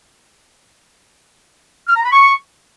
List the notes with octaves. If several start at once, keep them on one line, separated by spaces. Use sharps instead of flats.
F6
A#5
B5
C#6